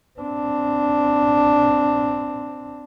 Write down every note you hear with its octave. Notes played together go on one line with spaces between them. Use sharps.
C4 D4